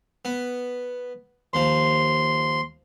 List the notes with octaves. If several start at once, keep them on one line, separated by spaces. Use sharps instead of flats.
B3
D#2 F3 C6